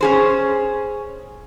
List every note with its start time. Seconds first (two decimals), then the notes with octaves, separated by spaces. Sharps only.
0.01 C#4 G#4 C5